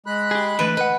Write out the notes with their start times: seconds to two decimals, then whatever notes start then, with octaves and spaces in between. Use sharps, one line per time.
0.06 G#3 B5 F#6
0.31 G4 G#4
0.59 D3 E3 A3 B4
0.77 B4 D#5 F#5